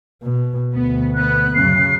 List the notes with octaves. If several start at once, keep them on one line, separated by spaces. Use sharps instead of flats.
B2
D2 B2 B3
B3 F#6
F#2 C#3 C7